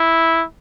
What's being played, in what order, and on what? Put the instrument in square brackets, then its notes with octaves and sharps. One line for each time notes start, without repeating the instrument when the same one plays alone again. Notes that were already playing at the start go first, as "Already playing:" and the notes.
Already playing: [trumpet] E4